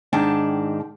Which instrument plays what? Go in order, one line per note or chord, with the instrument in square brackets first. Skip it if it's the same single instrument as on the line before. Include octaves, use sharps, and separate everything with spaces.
[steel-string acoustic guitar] G#2 D#3 D4 G5 A5